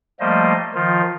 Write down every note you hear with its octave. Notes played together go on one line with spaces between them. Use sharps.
F3 G3 A3 A#3 C5 D#5
D#3 F3 F4